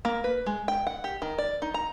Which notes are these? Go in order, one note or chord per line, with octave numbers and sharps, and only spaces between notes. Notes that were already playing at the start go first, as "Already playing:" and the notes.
A#3
B4
G#3
G5
F#5
G4
D#3
D5
D#4
A#5